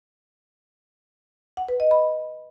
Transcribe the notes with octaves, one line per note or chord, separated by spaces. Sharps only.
F#5
B4
D#5
B5